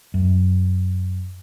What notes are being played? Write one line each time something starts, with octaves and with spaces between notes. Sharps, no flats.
F#2